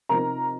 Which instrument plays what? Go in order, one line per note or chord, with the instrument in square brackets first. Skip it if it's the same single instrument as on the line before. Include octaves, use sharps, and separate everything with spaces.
[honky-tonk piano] C3 F3 C4 D#4 A#4 A#5